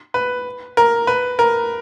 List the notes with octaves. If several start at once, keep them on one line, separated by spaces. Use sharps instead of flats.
B4
A#4
B4
A#4